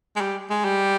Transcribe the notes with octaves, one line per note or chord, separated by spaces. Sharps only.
G#3
G3
G#3
G3